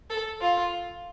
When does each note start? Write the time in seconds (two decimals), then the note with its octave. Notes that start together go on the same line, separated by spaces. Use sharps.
0.10 A4
0.41 F4